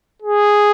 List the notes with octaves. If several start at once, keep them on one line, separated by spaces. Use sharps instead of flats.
G#4